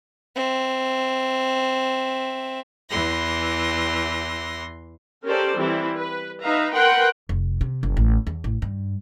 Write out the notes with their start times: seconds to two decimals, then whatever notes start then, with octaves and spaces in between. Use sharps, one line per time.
0.35 C4 E5
2.89 E2 E3 C6 A#6
5.26 C#4 G4 A4 A#4 C5 D5
5.57 E3 G3 C4 E4
5.97 B4
6.43 D#4 B4 E5 F5 A#5
6.74 A#4 B4 F#5 G5 C6
7.29 F1
7.61 C3
7.83 F#1
7.97 A1
8.27 E2
8.44 A1
8.62 G2